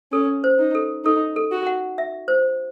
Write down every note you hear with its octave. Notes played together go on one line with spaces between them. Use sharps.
C#4 A4
C5
D#4
A4
D#4 A4
A4
F#4
F#5
E5
C5